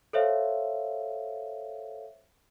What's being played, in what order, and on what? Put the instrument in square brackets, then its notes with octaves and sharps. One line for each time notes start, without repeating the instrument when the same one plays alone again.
[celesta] A4 C5 C#5 E5 F5